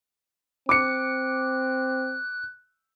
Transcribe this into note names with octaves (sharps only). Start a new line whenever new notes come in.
C4 D6 F#6 C#7